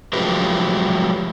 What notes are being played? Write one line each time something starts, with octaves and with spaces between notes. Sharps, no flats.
F3 F#3 G#3 A3 G4 B4